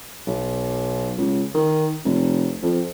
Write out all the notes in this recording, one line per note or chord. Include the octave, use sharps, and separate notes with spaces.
B1
C#2
D#3
F1
F2